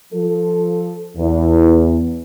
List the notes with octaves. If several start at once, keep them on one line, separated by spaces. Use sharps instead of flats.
F3 A4
E2